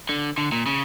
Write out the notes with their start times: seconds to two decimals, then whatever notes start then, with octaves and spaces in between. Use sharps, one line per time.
0.09 D3
0.38 D3
0.52 A#2
0.66 C#3